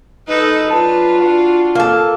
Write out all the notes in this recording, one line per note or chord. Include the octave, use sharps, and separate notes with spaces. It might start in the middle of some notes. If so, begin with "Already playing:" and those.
D#4 A4 B4
F#3 D4 F4 B4 A5
D4 F#4
A#3 A4